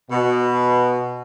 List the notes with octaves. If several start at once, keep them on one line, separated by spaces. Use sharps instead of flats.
B2